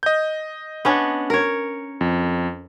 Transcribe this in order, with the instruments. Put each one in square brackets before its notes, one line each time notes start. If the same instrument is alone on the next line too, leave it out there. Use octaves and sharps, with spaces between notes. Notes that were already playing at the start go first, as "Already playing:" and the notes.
[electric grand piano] D#5 G6
[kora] B3 C#4 D4
A#4 C#5
[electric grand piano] F2